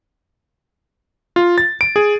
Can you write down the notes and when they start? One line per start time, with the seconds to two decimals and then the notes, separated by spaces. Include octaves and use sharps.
1.36 F4
1.58 A6
1.81 D7
1.96 G#4